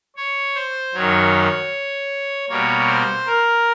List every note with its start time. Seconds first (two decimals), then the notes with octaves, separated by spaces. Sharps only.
0.16 C#5
0.55 C5
0.94 F#2 D#3 F#3 C#5
2.49 B2 G3 A#3 C#5
2.88 C5
3.26 A#4